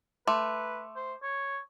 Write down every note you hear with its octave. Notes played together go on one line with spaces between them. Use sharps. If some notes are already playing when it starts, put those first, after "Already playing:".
A3 B4 C6 D6
C5
C#5